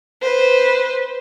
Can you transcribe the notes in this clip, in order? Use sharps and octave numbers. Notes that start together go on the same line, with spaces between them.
B4 C5